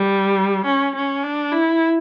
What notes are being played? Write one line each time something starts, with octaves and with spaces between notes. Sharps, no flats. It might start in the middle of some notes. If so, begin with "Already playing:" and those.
Already playing: G3
C#4
C#4
D4
E4